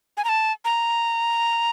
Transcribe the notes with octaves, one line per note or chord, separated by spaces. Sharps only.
G#5
A#5
A5
A#5